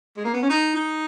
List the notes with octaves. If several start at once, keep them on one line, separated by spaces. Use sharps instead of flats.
G#3
A#3
B3
C#4
D#4
D#4